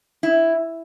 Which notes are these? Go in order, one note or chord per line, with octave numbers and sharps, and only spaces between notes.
E4